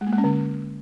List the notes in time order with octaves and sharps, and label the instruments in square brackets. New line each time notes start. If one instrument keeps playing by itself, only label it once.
[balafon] G#3
A#3
G#3
C#4
D3